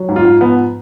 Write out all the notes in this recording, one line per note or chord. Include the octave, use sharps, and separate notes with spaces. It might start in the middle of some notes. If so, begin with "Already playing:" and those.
Already playing: F#3
G#2
F4
G#2
F3 B3